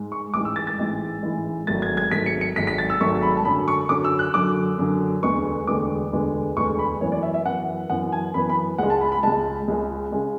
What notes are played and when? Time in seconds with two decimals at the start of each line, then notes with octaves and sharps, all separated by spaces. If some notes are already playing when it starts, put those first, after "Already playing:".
Already playing: G#2 G#3
0.12 C#6
0.34 A1 G#2 E3 G#3 D6
0.45 E6
0.56 A6
0.67 A6
0.78 A1 G#2 E3 G#3
1.23 A1 G#2 E3 G#3
1.67 G#1 G#2 F#3 A3 A6
1.82 G#6
1.97 G#6
2.11 G#1 G#2 F#3 A3 B6
2.26 C#7
2.41 C#7
2.56 G#1 G#2 F#3 A3 B6
2.67 B6
2.78 A6
2.90 E6
3.01 G#1 G#2 F#3 A3 C#6
3.23 B5
3.37 A5
3.45 F#2 D3 F#3 B5
3.68 C#6
3.89 F#2 D3 F#3 D6
4.04 E6
4.19 F#6
4.34 F#2 D3 F#3 D6
4.78 F#2 D3 F#3
5.23 E1 D2 D3 G#3 B3 C#6
5.67 E1 D2 D3 G#3 B3 D6
6.12 E1 D2 D3 G#3 B3
6.56 E1 D2 D3 G#3 B3 C#6
6.79 B5
7.01 F#2 E3 B3 C#5
7.12 D5
7.23 E5
7.34 E5
7.45 F#2 E3 B3 F#5
7.90 F#2 E3 B3 F#5
8.12 G#5
8.34 F#2 E3 B3 B5
8.49 B5
8.78 C#2 C#3 G#3 F#5
8.90 A5
9.01 B5
9.12 B5
9.23 C#2 C#3 G#3 A5
9.68 C#2 C#3 G#3
10.12 C#3 G#3